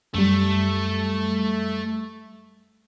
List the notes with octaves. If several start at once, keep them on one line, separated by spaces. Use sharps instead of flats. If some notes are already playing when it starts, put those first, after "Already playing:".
F#2 G3 A3